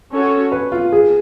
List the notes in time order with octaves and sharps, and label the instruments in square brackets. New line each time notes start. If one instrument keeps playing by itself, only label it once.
[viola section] C#4 F#4 A4 C#5
[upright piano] B4
F4
G#4